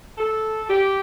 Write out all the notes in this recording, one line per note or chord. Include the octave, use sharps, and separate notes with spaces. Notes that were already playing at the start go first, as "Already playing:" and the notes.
A4
G4